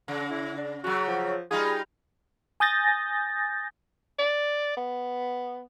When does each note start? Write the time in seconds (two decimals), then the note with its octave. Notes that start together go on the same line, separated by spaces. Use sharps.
0.08 C#3
0.31 E4
0.58 D4
0.84 C#3 F#3 F#4
1.08 F3
1.51 G3 D#4 F4 G#4
2.60 G#5 D#6 G6 A6 A#6
4.19 D5
4.77 B3